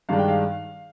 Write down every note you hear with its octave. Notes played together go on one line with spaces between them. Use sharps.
G2 D#3 G#3 D4 F5
G5
F5